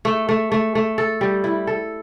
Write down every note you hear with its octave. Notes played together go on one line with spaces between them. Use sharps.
A3
A3
A3
A3
A4
G3
E4
A4